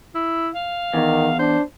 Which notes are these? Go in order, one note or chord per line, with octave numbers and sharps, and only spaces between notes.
E4
F5
E2 D#3
D4 C5